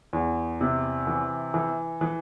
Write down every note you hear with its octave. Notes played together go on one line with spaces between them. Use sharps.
E2
C3
E3
E3
E3